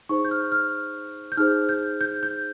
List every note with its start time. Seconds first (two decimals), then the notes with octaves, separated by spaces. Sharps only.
0.09 D#4 G#4 C5 C#6
0.25 G6
0.31 F6
0.52 F6
1.32 G6
1.37 D#4 G#4 C5 F6
1.69 G6
2.01 G6
2.23 G6